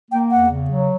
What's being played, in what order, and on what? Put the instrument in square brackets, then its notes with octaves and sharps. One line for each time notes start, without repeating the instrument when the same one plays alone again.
[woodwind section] A#3 [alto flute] G5
[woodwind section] E2 [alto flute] F#5
[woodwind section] C#3
F#3